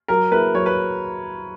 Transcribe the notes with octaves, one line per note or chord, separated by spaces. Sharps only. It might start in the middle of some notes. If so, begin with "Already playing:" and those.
F#3 A#4
A#3 E4 G#4 B4
F#3 C#5
B4